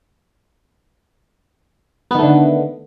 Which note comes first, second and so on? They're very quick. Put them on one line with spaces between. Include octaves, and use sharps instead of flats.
B3 D#3 A3 D3